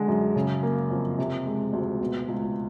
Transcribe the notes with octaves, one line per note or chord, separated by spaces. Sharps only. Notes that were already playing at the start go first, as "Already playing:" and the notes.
Already playing: D3 G#3
F#2
C#3
A#3
F2
C3
G#3
D2
B2
C#2